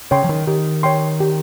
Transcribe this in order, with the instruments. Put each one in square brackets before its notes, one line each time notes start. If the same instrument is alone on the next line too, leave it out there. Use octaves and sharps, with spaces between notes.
[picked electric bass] C#3 [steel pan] C#5 G5 C6
[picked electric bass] F3
D#3
[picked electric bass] D#3 [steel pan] G4
[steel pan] C#5 G5 C6
G4